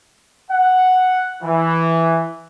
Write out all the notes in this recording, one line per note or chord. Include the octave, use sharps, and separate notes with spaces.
F#5
E3